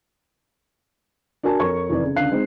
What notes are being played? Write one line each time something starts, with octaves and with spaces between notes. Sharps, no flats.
D4 F#4 A#4 G#5 A5
F2 A#4 C#5 C#6 G#6
F1 E3 D5
C#3
C#2 D3 D4 F5 F#6 C7
G#3 C4 D#4